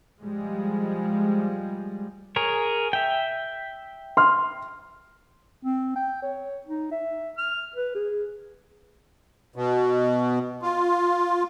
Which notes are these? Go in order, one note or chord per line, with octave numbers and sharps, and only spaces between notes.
F3 G3 G#3
G#4 A#4 C#5
E5 G5
C6 F6
C4
G5
C#5
D#4
E5
F6
B4
G#4
B2
F4